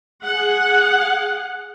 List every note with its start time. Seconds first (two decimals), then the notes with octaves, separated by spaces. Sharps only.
0.24 G#4 F#5